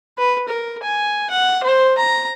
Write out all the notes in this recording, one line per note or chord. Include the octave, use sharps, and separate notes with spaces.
B4
A#4
G#5
F#5
C5
A#5